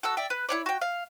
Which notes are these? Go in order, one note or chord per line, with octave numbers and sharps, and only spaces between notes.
F#4 A4 E6
D5 E5 G5
B4
E4 C#5 D5
F#4 G5
F5